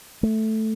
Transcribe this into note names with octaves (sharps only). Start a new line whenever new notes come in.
A3